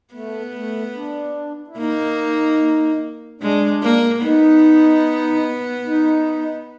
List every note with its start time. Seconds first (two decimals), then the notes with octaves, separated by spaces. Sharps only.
0.14 A3 B3
0.55 A3
0.95 D4
1.68 E4
1.77 A#3 D#4
3.41 G#3 D4
3.82 A#3
4.23 B3 D#4
5.86 D#4